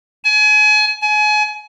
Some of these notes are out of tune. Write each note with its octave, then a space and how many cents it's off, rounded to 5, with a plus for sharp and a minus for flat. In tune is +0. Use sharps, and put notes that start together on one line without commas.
G#5 +30
G#5 +30